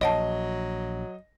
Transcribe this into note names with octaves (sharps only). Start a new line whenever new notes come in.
A#1 F#3 C#5 D#5 F#5 A5